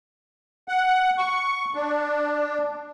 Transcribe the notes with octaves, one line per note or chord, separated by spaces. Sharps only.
F#5
C#6
D4